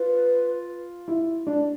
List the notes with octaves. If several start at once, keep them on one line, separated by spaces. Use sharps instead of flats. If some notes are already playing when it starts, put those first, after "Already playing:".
Already playing: F4 B4
E4
D4